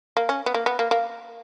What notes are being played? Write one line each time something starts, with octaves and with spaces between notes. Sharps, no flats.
A#3
C#4
B3
A#3
B3
A#3
A#3